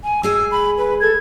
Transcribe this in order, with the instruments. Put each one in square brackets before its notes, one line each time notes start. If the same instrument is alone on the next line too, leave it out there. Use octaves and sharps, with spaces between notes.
[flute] G#5
[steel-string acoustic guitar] G#3 G#4 G#5 [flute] E6
[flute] B5
B4
[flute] A4 [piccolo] G#6